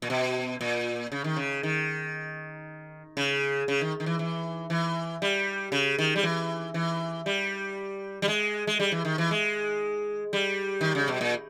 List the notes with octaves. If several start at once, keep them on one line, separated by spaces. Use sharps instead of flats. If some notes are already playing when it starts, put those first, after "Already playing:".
A#2
B2
A#2
C#3
D#3
C#3
D#3
C#3
C#3
D#3
D#3
E3
E3
E3
G3
C#3
D#3
G3
E3
E3
G3
G3
G#3
G#3
G3
E3
D#3
E3
G#3
G3
D#3
C#3
B2
A#2